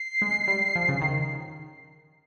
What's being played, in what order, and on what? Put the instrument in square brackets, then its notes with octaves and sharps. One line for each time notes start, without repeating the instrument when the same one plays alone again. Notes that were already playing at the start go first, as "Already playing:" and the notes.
Already playing: [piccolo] C7
[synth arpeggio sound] G#3
G3
F3
C#3
D#3